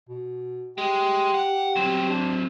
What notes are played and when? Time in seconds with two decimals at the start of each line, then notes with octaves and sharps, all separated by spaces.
0.09 B2
0.78 G#3 G4
1.34 F#5
1.76 F#3 C4
2.09 D4